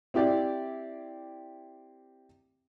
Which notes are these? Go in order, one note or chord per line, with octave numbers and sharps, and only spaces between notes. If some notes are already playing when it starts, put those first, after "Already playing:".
C4 E4 G4 D5